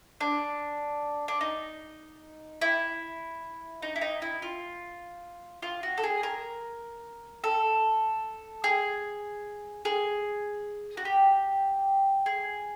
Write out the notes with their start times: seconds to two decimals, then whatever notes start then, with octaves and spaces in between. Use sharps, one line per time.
0.21 D4
1.28 D4
1.41 D#4
2.61 E4
3.82 D#4
3.96 E4
4.01 D#4
4.22 E4
4.42 F4
5.62 F4
5.83 F#4
5.98 A4
6.04 G#4
6.23 A#4
7.44 A4
8.64 G#4
9.85 G#4
10.97 F#4
11.05 G4
12.26 G#4